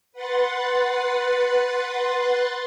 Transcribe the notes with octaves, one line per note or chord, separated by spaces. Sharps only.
B4 F#5 C6 A6